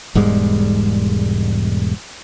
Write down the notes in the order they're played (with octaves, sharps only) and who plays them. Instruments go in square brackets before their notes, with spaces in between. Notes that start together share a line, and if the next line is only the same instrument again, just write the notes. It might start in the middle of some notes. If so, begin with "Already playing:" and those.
[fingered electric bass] E1 G#2 G3 G#3